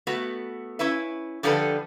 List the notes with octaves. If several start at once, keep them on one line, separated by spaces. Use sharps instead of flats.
A3 B3 F#4
C#4 E4 B4 E5
D3 F3 G3 D4 A4 B4